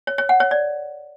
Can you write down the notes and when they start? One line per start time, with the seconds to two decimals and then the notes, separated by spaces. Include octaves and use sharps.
0.07 C#5
0.18 C#5
0.29 F#5
0.40 C#5
0.51 D5